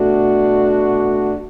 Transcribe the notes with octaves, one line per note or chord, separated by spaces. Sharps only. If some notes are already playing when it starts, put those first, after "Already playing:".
Already playing: B2 A3 D4 F#4